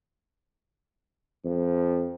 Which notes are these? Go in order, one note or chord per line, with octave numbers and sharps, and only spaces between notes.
F2